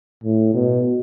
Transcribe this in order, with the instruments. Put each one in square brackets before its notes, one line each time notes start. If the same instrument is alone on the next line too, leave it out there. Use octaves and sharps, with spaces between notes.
[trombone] A2
B2